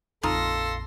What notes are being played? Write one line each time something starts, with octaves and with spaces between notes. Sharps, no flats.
A#1 F2 D#4 F4 A4 C6 A#6